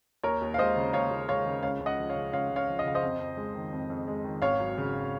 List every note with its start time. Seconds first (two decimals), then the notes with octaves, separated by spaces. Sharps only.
0.23 D#2 A#4 C#5
0.41 D#2
0.54 F5
0.58 G#3 C5 D#5
0.76 C#3
0.93 D#2 C#5 F5
1.11 D#2
1.28 G#3 C#5 F5
1.46 C#3
1.63 C#2 C#5 F5
1.80 C#2
1.86 D#5 F#5
1.98 F3
2.10 C#5 F5
2.15 C#3
2.33 C#2 C#5 F5
2.51 C#2
2.56 C#5 F5
2.68 F3
2.79 D#5
2.85 C#3 F5
2.94 C5 D#5
3.03 F2
3.20 F2
3.37 G#3
3.55 D#3
3.73 F2
3.90 F2
4.08 G#3
4.24 D#3
4.42 G#1 C#5 F5
4.60 F#3
4.78 C#3